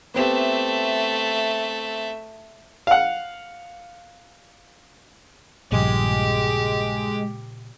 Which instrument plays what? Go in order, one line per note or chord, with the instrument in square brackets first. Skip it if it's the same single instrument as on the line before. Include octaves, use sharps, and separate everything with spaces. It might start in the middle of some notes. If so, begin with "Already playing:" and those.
[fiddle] A3 E5 [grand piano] B3 C4 G4
[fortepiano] F5 F#5
[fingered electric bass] A#1 G2 [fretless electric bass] A#2 C#3 F3 [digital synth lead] G#3 [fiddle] G4